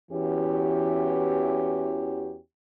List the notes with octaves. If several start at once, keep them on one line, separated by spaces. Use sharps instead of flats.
E2 E3 C#4 F#4 G4